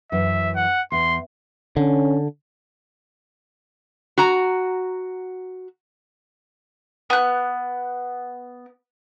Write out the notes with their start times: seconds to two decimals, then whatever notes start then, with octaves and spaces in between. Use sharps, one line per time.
0.12 F#2 E3 E5
0.56 F#5
0.92 E2 C6
1.77 D3 C#4
4.18 F#4 A#5
7.10 B3 F#6